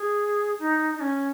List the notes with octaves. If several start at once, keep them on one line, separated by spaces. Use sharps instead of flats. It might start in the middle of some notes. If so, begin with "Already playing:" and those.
Already playing: G#4
D#4
D#4
C#4